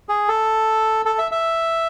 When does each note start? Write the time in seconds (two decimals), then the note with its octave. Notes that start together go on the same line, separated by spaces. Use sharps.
0.09 G#4
0.28 A4
1.06 A4
1.18 E5
1.31 E5